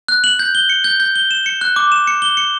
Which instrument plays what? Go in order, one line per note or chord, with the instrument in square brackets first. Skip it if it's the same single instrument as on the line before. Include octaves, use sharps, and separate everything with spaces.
[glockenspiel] F#6
F#7
G6
G7
C#7
G6
G6
G7
E7
C#7
F#6
D6
E7
C#7
G7
C#7